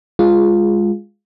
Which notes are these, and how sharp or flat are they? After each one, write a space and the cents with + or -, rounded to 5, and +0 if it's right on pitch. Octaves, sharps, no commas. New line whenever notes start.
G#3 -15 F4 +0 G#4 +0